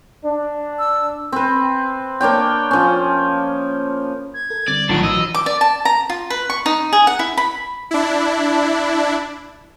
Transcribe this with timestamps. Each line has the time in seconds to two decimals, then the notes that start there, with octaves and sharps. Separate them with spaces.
0.24 D4
0.79 E6
1.32 C4 B4
2.21 A#3 D4 C#5 G5
2.71 F3 C#4
4.34 G#6
4.50 A4 A#4
4.68 D3 G3 C4 D5
4.89 A#1 A2 D#3 F#3 D4 F4 F#5 D7
5.03 E3 F#3 D#5 E6
5.35 D6
5.46 D5
5.61 A5
5.85 A#5
6.09 F4
6.30 B4
6.50 C#6
6.66 D#4
6.93 G#4
7.07 F#5
7.19 E4
7.37 B5
7.91 D4 E4